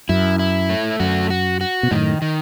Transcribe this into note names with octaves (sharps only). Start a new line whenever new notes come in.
F#2 E4
E4
A3
F#2 F#4
F#4
F#4
B2
F#2 A2 D#3
D#3